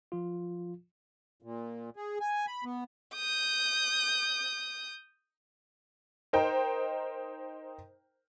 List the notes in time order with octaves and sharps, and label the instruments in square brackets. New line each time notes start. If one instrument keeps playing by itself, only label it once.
[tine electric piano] F3 F4
[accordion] A#2
G#4
G#5
B5
B3
[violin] D#6 G6
[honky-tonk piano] D#4 A#4 C5 G5 A#5